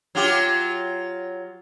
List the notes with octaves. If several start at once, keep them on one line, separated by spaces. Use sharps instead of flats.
F#3 F4 G4